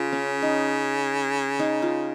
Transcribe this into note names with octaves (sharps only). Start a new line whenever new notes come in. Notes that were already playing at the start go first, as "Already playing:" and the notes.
Already playing: C#3 F4
C#4
D#4
D#4
F4